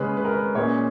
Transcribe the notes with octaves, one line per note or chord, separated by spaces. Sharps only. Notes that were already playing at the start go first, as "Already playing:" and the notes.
Already playing: C#3 G#3 C#4 B4
B4
A#4
B4
A#2 G#3 C#4 C#5